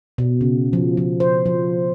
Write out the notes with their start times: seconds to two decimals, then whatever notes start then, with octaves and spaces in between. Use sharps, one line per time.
0.18 B2
0.41 C#3
0.73 F3
0.97 F3
1.20 C5
1.46 F3